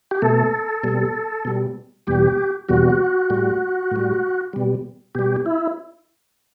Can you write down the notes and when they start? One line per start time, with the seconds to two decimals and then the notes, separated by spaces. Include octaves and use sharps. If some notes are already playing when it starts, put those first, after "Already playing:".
0.11 G4
0.22 B2 A3 A4
0.84 B2 G3
1.45 B2 G3
2.07 E2 B2 G3 G4
2.69 E2 B2 G3 F#4
3.30 A2 G3
3.91 A2 G3
4.53 B2 G3
5.15 B2 G3 G4
5.46 E4